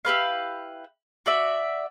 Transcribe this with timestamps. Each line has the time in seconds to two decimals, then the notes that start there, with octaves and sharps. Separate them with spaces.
0.05 E4 G4 B4 F5
1.26 F#4 D5 E5